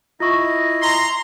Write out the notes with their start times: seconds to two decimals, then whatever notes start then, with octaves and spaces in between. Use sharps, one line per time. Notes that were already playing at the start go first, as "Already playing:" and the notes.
0.20 E4 F4 D#5 C#6
0.82 A#5 C6